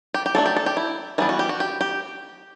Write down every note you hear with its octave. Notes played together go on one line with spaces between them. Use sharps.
G4
G4
F#3 A3 D4 A4
G4
A4
G4
E4
E3 G3 B3 D4
F#4
G4
F#4
G4
G4